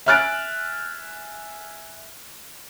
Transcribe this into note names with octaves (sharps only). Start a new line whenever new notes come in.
E5 G#5 F6 F#6 A6 D7